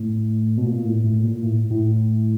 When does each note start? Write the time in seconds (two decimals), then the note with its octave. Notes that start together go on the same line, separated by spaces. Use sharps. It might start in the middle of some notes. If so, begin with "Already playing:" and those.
Already playing: A2
0.58 B2
0.67 A#2
0.85 A2
1.04 A2
1.24 A#2
1.42 A2
1.70 A2